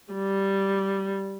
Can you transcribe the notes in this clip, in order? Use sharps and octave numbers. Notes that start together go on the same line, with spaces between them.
G3